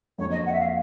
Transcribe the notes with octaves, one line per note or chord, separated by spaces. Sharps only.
F2 D3 F#3 A#3 C#5
D#5
F#5
E5
F5